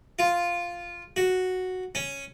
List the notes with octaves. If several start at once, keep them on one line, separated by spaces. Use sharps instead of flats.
F4
F#4
C#4